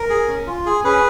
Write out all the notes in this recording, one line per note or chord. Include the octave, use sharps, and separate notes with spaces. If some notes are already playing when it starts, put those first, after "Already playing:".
Already playing: A#4
G#4
C#4
F4
G#4
C#4 G#4 B4